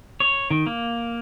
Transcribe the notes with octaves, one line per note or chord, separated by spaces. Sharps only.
C#5
D#3
A#3